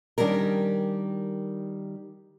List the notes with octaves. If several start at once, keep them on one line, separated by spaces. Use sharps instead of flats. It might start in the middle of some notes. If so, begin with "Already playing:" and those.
D#3 G3 C#4 D4 A#4